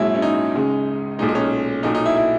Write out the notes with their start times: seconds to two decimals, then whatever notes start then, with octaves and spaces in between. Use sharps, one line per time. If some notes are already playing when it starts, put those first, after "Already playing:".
Already playing: A#1 G#2 F#3 E4
0.15 C#4
0.22 D#4
0.55 C#2 C#3 G#3
1.19 B1 A#2 G#3 D#4
1.29 D#4
1.35 C#4
1.83 B1 A#2 F#3 D#4
1.95 D#4
2.06 E4
2.16 E4